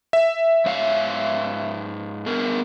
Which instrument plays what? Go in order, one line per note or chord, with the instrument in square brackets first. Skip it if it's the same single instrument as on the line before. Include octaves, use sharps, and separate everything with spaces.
[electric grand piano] E5
[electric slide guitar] G#2 C#5 F5
B3 G#4 A#4